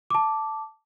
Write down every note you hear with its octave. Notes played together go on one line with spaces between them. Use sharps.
A5 D6